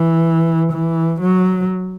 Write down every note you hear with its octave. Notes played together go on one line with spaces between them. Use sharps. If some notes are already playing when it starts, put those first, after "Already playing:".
Already playing: E3
E3
F#3